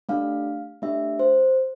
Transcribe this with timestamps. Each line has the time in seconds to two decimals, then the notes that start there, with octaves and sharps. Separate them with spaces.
0.09 A3 D4 G4 F5
0.82 A3 D4 G4 E5
1.19 C5